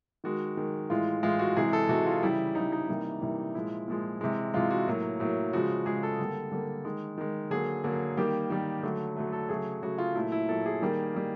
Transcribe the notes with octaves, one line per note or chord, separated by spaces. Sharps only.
D#3 G#3 F#4
D#3 G#3
A2 E3 G#3 F4
A2 E3 G#3 F4
F#4
C3 E3 G#3 G#4
A4
C3 E3 G#3 F#4
F4
C#3 E3 G3 E4
C#3 E3 G3 D#4
D#4
C3 E3 G3 A#3
C3 E3 G3 A#3
A#2 F3 G#3 E4
A#2 F3 G#3
C3 E3 G#3
C3 E3 G#3 F4
F#4
A2 F#3 A#3
A2 F#3 A#3
C#3 F3 G#3 F#4
C#3 F3 G#3 G#4
A4
D3 G3 A#3
D3 G3 A#3
D#3 G#3
D#3 G#3
D3 F#3 A#3 G#4
D3 F#3 A#3
D#3 G3 A#3 G4
D#3 G3 A#3
D3 F#3 A3
D3 F#3 A3
A4
C#3 F#3 A3 G#4
C#3 F#3 A3 F#4
F4
A#2 F#3 A3 E4
E4
A#2 F#3 A3 A4
G#4
D#3 G3 A#3
D#3 G3 A#3